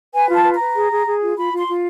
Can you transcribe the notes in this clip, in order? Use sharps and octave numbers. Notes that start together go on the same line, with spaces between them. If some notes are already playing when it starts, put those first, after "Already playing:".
B4 G#5
F4 A5
B4
B4 A#5
G#4
G#4
G#4
F4
F4 B5
F4 C6
F4